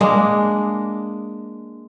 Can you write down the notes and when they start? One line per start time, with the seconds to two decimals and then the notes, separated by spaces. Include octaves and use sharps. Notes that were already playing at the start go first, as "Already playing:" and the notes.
0.01 G#3 A#3 D4 D#5